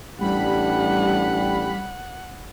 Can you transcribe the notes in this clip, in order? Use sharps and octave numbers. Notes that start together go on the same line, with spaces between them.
A1 G3 D4 G4 F#5 B5